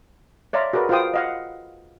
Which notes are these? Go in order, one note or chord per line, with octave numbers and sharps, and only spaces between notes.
C#5 D5 E5 F5 A#5 C6
F#4 G#4 A#4 B4 D5
F4 F#4 C5 F5 G5 D#6
D#5 F5 F#5